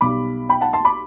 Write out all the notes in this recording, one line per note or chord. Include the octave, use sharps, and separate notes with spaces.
B1 B2 G3 B5 D6
G5 B5
F#5 A5
A5 C6
B5 D6